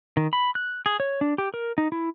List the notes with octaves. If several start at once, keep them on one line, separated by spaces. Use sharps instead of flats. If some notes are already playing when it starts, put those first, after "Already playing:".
D#3
B5
F#6
G#4
C#5
D4
G4
A#4
D#4
E4